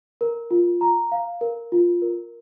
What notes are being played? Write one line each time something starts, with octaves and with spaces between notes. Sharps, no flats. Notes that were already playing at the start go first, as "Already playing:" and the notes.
A#4
F4
A#5
F5
A#4
F4
A#4